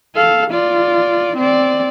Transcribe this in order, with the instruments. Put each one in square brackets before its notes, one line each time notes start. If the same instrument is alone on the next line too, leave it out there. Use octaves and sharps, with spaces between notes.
[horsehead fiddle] A4 F5
F4 D5
C4 D5